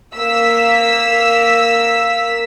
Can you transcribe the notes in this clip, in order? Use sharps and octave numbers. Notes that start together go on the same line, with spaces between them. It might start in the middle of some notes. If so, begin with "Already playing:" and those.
A#3 E6 B6